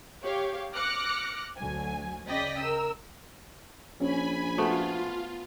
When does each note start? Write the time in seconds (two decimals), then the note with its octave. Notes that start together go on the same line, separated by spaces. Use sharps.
0.23 G4 C#5 F5 G5
0.74 D6 F6 F#6 A#6 C#7
1.56 D2 F#3 G#5
2.27 C#3 D5 D#5 G5 A#6 B6
2.59 A#4 E6
4.00 A#1 C#4 G#5 B5
4.58 A3 B3 F4 F#4 C5 C#6